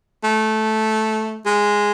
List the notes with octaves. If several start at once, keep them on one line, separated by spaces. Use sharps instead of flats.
A3
G#3